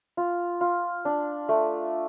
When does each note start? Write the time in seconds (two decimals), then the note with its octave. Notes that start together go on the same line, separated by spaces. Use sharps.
0.17 F4
0.61 F4
1.05 D4
1.49 A3